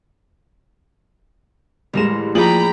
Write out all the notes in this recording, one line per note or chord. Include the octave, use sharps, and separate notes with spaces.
A1 G3 G#3 A#4 E7
F3 A#3 G#4 D5 G5 A#5 B5 F#7